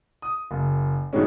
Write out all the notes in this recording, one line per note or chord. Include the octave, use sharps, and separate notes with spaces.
D#6
F#1
B2 D3 D#3 G3 G#3 C#4